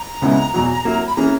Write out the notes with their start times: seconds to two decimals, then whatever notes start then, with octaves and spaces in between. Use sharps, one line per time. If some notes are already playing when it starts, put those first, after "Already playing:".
Already playing: A#5
0.22 C#2 C#3 G#3 B3 E4
0.53 E2 B2 F#3
0.85 F#3 A#3 E4
1.07 B5
1.16 E3 A#3 C#4 G#4 A#5